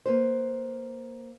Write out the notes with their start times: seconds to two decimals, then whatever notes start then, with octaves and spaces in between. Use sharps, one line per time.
0.06 A#3 B4 C5